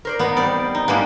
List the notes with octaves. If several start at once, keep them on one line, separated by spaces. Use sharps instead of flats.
A#4 C5 D5
B3 D#4
G3 C4 D5
D#4
G3 G#3 A#3 B3 D4 E4